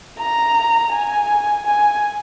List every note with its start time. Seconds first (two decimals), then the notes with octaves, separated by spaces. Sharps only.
0.19 A#5
0.93 G#5
1.66 G#5